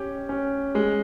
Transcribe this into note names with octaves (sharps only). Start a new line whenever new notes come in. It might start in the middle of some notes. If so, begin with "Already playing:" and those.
Already playing: C#4 G4
C#4
G#3